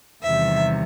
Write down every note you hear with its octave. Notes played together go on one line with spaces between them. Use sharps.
E2 C3 D#3 G3 E5